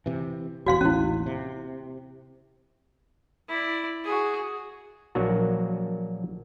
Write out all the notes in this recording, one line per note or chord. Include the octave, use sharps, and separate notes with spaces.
C3 E3
D#1 E2 F#4 F5 C6
A1 D#2 C#4 E4
C3
E4 D5
F#4 G#4
A#1 F#3 A#3 D4 F#4